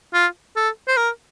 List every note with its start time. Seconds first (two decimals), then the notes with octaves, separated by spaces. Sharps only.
0.14 F4
0.56 A4
0.88 C5
0.97 A#4